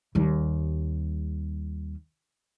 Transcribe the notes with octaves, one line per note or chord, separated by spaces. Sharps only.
D#2 G3